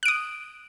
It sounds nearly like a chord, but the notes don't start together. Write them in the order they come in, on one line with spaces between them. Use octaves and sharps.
F#6 D7 D#6